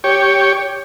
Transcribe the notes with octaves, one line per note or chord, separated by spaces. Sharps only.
G4 C#5